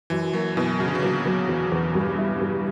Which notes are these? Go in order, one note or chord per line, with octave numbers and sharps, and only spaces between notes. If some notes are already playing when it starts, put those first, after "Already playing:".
F#2 E3
F#3 A#3
B2 E3
F#2 C#3
D3
C#3
A#2 F#3
F#3
E2
E2
G2
E4
G2